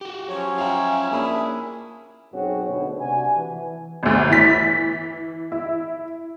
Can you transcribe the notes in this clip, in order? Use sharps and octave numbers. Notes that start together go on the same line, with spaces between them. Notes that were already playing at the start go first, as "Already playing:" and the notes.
F#4 G4
F3 F#3 C#4 C#5
F4 E5 F5 G5 A#5
A#3 D4 E4 G#4 G#5 B5
B1 F#2 C4 F#4 G#4 C#5
D2 B2
C3 D4 F#4 G#5
E3
G1 D2
E3 A6 B6
E4